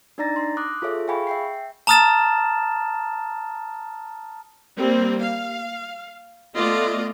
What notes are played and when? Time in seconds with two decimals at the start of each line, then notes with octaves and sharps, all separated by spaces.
0.18 D4 D#4 D5 A#5 A6 A#6
0.36 C6 A#6
0.57 C6 D6 D#6 F#6
0.82 F4 G#4 A4 C#5 E5
1.08 G#4 F5 G5 G#5 B5 C#6
1.27 E5 G5 C7
1.87 A5 A#5 D#6 F6 A6 E7
4.76 G3 A#3 C4
5.22 F5
6.56 A3 B3 F4 D5 D#5